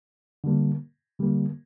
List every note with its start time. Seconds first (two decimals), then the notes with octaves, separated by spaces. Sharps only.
0.44 D3 G3 A#3
1.19 D3 G3 A#3